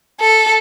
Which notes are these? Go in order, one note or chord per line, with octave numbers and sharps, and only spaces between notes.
A4